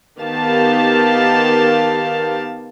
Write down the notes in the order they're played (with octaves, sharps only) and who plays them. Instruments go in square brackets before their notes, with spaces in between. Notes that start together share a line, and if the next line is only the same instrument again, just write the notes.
[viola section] D#3 B3 G4 F5 A5